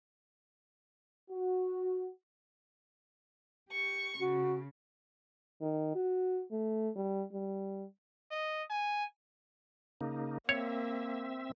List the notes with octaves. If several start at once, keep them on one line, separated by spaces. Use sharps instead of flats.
F#4
G4 C#6
C#3 F#4
D#3
F#4
A3
G3
G3
D#5
G#5
C#3 A#3 D#4
A#3 C4 C#5 E5